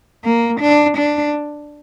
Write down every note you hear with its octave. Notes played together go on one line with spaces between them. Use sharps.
A#3
D4
D4